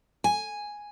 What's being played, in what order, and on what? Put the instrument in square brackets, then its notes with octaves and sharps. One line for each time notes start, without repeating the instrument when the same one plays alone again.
[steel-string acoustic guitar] G#5